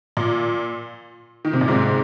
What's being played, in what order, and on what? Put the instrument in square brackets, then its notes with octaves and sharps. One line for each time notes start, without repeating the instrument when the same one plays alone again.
[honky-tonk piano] A#2
D#3
C3
A#2
G#2 C3